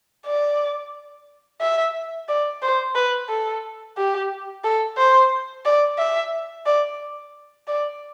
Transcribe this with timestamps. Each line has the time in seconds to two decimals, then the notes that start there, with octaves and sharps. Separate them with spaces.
0.26 D5
1.61 E5
2.28 D5
2.62 C5
2.95 B4
3.29 A4
3.97 G4
4.64 A4
4.97 C5
5.65 D5
5.98 E5
6.66 D5
7.67 D5